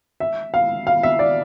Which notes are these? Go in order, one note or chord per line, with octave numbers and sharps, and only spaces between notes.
E5
F5
F5
E5
D5